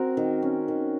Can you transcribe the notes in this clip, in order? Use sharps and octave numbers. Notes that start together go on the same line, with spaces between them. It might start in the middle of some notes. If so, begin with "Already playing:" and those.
Already playing: C4 F#4 A#4
D#3
C#4
D#3